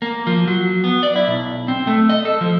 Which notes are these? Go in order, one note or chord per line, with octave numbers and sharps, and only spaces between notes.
A#3
F3
F#3
B3
D5
E4
B1
C4
A3
D#5
A4
F3